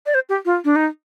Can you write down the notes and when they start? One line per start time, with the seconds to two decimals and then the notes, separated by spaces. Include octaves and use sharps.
0.06 D5
0.14 C5
0.29 G4
0.45 F4
0.65 D4
0.76 D#4